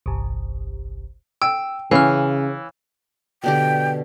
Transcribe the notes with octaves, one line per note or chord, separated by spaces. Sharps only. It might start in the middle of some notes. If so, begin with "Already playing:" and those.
G1 C2
G5 E6
C#3 E3 C#4 F5 F6
B2 D3 G4 G5